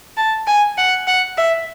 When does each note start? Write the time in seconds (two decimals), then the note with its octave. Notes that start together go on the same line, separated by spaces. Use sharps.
0.17 A5
0.47 G#5
0.78 F#5
1.07 F#5
1.38 E5